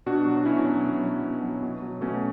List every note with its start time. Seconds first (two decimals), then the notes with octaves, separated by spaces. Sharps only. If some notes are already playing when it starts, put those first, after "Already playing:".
0.06 B2 D4 F#4
0.26 F#3
0.37 F#4
0.45 B2 C#4 E4
0.65 F#3
0.84 B2
1.03 F#3
1.24 B2
1.43 F#3
1.62 B2
1.82 F#3
2.01 B2 A3 C#4